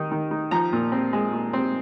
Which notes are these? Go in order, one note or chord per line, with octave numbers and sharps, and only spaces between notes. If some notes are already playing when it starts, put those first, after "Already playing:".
Already playing: D#3 D#4
D#3
D#4
F3 A#5
A#2
C4
G#3
A#2
C4